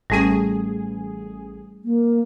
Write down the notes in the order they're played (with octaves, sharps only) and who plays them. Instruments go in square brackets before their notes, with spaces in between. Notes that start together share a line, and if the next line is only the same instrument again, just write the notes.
[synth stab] A1 G#4 [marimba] G3 A3 C#4
[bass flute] A#3